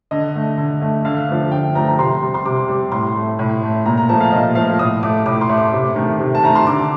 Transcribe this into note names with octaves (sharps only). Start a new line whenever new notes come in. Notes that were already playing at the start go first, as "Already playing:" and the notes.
D3 D#5
A3
D3
A3
D3 F5
F3 A3
D3 G5
F3 A3 A#5
A#5
C3 C6
G3
C6
C3 D6
G3
A2 C6
A3
A2
A3
A#2 A#5
A#5
F3 A3 A5
F5
A#2 D#5
F3 A3 F5
A2 D#6
A3 D6
A2 D6
C6
A3
D6
C3
D#3 A3
C3
A5
D#3 A3 A#5
C6
D3 D6